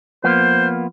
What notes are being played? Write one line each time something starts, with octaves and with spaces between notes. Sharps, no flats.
F3 A#3 B3 C5